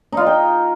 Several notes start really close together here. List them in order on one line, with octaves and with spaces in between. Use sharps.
D#4 F4 D#5 G5